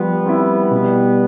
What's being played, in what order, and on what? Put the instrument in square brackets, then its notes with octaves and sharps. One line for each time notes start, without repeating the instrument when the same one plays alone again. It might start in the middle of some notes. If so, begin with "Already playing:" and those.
Already playing: [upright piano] F3 [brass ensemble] G3 B3
[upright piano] C4 E4
B2